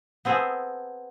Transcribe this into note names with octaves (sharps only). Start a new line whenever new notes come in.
B3 C4 G#4 A4